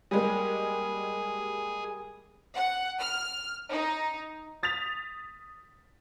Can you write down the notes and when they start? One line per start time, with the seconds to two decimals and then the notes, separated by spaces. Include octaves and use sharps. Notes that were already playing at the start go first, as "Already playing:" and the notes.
0.11 G3 G#3 A#3 G#4
2.56 F#5
2.99 F6
3.71 D#4
4.63 D#6 A6 B6 F7